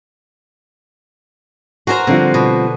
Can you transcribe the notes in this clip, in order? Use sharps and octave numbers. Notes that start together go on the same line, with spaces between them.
F#4 G#4 A#4 C5 A#5
D3 F3 G3 C4
B2